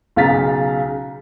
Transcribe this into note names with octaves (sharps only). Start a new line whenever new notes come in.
B1 C#3 F5 A#5 A6 B6